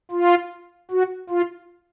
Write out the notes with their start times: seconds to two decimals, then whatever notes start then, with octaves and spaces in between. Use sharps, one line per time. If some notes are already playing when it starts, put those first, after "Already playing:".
0.11 F4
0.91 F#4
1.30 F4